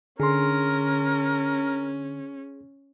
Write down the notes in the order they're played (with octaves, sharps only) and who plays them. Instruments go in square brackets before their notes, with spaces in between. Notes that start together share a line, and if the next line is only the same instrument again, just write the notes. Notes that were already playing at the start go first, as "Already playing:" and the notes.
[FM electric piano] D3 [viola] C#4 [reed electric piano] G#4 C6 [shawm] A#4